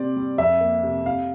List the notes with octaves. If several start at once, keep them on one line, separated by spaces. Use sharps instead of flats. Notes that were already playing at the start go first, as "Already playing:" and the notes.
Already playing: C3 C4 D5
G3
F2 E5
A#3
C3
C3 F5